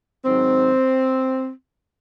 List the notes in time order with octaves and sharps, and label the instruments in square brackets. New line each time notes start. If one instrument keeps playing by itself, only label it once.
[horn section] G#2 D#3 F#3 C4